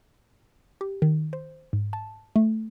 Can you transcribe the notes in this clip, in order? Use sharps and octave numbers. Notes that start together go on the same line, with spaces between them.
G4
D#3
C5
G#2
A5
A3